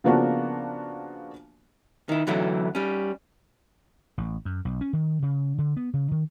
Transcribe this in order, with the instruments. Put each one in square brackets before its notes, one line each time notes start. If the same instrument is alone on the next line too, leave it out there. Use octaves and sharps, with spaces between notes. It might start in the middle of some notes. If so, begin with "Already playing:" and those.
[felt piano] C#3 F3 A#3 B3 D4 F#4
[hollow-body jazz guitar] D#3 E4
F#2 D3 E3 F#3 A3 E4
G3 C#4
[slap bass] A1
F#2
B1
C#4
D#3
C#3
D3
B3
C#3
D#3